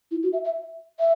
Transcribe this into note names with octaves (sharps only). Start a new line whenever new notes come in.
E4
F#4
E5
E5
E5